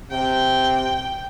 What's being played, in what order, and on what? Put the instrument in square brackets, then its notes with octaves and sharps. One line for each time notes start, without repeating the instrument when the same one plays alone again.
[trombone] C3 [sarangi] G5